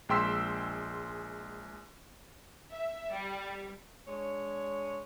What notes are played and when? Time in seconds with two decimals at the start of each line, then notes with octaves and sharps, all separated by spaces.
0.09 A#1 G#3 G5 C6 E6 B6
2.70 E5
3.12 G3
4.07 G#3 D4 C#5